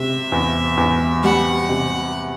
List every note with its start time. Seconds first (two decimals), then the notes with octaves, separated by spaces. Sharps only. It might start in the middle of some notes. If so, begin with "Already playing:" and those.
Already playing: C3 E5
0.32 E2
0.77 E2
1.23 G3 F#5
1.69 C3